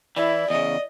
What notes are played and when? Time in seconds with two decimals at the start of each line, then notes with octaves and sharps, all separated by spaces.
0.16 E3 E4 D5
0.50 E2 C#3 D#5